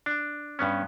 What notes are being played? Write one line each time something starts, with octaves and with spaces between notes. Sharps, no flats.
D4
G2 B3 C#4